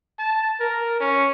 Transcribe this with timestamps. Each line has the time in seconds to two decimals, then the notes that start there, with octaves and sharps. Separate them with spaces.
0.19 A5
0.60 A#4
1.00 C#4